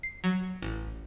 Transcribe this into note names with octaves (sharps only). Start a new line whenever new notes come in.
C7
F#3
A1